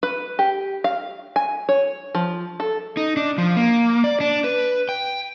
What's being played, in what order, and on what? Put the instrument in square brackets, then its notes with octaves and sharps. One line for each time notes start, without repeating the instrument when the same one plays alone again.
[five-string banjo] B4
G4
F5
G#5
C#5
F3
A4
[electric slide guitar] D#4
D4
F3
A#3
D5
D4
B4
G5